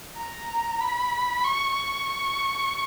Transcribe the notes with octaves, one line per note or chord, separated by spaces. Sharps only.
A#5
B5
C#6
C#6